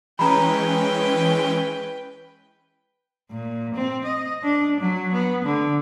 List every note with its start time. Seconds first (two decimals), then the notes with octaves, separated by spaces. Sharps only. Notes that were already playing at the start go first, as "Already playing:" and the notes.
0.19 E3 G#3 C#4 B4 G5 A#5 B5
3.30 A#2
3.74 C4
4.05 D#5
4.43 D4
4.80 F#3
5.13 B3
5.44 D3